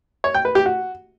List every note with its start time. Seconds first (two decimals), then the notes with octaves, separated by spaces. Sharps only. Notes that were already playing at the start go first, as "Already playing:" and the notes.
0.24 C#5
0.34 G5
0.45 B4
0.55 G4
0.66 F#4